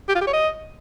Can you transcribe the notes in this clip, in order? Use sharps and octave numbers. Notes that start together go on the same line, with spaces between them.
G4
F4
G4
C#5
D#5